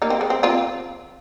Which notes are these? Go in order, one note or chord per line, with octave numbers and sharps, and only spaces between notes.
A#3 D#4
C4
G#3
C4
C4 F4